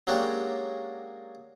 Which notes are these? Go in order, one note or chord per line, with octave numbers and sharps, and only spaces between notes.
F#3 G#3 A#3 C#4 D4 G4